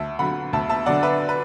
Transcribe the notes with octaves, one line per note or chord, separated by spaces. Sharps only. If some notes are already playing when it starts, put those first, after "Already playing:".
Already playing: D2 E5 A5
D3 F#3 F#5 B5
D2 E5 A5
E5 A5
D3 F#3 D5 F#5
B4 E5
B4